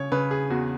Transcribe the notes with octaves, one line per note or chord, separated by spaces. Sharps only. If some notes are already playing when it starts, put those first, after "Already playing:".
Already playing: C#3 C#5
C#3 B4
G#4
E2 F#4